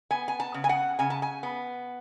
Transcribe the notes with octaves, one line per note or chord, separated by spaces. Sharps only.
B3 G#5
G#5
A5
C#3
G#5
F#5
C#3 G#5
A5
G#5
B3